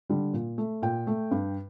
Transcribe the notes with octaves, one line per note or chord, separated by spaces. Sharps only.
D3 G3
A#2
A3
A#2 G5
A3
G2